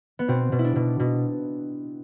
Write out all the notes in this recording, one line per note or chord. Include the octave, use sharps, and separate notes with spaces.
B3
B2 C4
B2
E4
D4
B2
B2